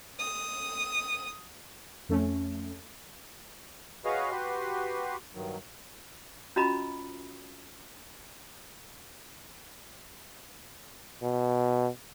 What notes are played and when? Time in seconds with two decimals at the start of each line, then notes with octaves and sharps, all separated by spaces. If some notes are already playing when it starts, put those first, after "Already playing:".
0.19 D#6
2.09 F2 A3 C#4
4.05 F#4 G#4 B4 C#5 D#5 F5
4.31 F#4 G4 B4 C6
5.35 G2 D#3 F#3
6.56 C#4 F4 F#4 D#5 A#5 B5
11.23 B2